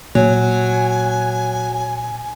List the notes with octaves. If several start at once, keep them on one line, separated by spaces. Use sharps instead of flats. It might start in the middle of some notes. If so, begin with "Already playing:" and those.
A#2 F#3 A#3 G#5